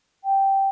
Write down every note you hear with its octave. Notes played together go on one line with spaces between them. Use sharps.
G5